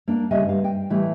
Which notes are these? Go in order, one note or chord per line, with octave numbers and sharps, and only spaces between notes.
A#3 D4
D2 C#3 G3 D#5 E5 G#5
G2 F5
G5
A2 E3 G3 A3